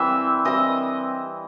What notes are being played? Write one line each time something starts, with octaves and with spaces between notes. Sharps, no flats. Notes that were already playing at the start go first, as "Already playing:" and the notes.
Already playing: E3 G3 C4 E5
E3 G3 C4 D#5